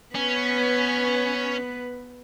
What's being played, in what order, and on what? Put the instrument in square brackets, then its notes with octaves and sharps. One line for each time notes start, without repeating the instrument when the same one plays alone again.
[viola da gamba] B3 B4 [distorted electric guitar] C#4